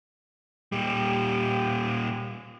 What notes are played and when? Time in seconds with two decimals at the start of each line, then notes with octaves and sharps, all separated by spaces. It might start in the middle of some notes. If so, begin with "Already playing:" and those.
0.72 A#2 G3 G4